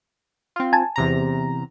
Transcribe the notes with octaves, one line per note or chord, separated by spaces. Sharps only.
C4 F4
G#5 A5
E2 C3 A#5